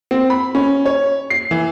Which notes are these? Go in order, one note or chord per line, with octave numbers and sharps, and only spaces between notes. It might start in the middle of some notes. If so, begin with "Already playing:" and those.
C4
B5
C#4
C#5
C7
E3